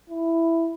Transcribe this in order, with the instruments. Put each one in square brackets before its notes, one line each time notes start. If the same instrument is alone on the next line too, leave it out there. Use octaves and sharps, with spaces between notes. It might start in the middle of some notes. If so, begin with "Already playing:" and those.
[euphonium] E4